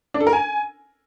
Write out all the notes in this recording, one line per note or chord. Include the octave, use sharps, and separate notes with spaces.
D4
A4
A#4
G#5